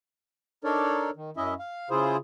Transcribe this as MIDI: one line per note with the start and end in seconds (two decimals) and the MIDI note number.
0.64 1.10 62
0.64 1.10 63
0.64 1.10 69
0.64 1.10 70
0.64 1.10 73
0.64 1.10 74
1.16 1.30 51
1.37 1.54 42
1.37 1.54 61
1.37 1.54 64
1.37 1.54 75
1.37 1.54 76
1.59 1.89 77
1.90 2.17 49
1.90 2.17 64
1.90 2.17 65
1.90 2.17 68
1.90 2.17 72